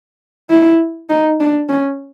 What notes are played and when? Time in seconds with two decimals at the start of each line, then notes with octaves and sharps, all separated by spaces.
0.50 E4
1.09 D#4
1.40 D4
1.69 C#4